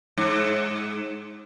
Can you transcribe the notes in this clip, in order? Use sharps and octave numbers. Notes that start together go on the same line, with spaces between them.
G#2